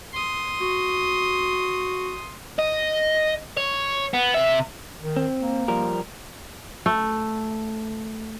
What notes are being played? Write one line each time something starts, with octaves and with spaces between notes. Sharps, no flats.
C6 D#6
F#4
D#5
C#5
B3
C3 E5
D#3
C4
A#3
F3 G3 A#4
A3